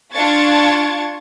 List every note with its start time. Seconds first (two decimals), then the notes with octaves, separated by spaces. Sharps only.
0.12 D4 F4 C#6 G#6 A6